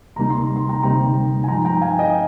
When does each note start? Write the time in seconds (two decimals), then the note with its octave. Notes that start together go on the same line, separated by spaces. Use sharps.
0.16 D2 C3 G3 A#3 D#4 A#5
0.30 C6
0.43 A#5
0.56 C6
0.69 G5 A#5
0.83 D2 C3 G3 A#3 D#4 G5 A#5
1.44 G#5
1.48 G2 F3 G#3 D#4 G5 A#5
1.65 G5 A#5
1.81 F5 G#5
1.99 D#5 G5